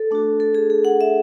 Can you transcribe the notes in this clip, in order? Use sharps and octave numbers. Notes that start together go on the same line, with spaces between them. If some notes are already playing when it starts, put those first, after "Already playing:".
Already playing: A4
A3 D4 F#4
A4
G#4
G#4
F#5
E5